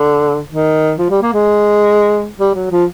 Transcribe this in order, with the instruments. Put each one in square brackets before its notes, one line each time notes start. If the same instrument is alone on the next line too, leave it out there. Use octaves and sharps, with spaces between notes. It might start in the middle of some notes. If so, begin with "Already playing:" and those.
Already playing: [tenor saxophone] D3
D#3
F3
G3
A#3
G#3
G3
F#3
F3